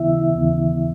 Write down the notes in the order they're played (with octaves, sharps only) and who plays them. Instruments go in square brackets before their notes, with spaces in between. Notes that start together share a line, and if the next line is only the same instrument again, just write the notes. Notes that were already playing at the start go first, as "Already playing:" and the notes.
Already playing: [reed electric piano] D#2 C#3 E3 B3 E4 E5
D#2 C#3 E3 B3